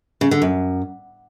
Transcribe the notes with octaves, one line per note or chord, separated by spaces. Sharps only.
C#3
D3
F#2